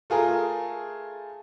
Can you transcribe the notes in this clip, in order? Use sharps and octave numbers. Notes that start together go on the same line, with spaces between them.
A3 F4 G#4 A#4